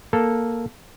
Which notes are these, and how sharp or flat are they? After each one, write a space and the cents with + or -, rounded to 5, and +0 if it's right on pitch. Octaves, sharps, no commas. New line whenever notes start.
A#3 +0 A4 +0